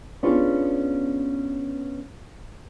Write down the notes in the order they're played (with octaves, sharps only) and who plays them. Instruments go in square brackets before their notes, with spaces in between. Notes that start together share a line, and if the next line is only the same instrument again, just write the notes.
[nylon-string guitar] B3 C#4 D4 F4 G4 G#4